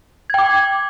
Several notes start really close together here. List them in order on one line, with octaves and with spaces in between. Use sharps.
G#6 G5 D6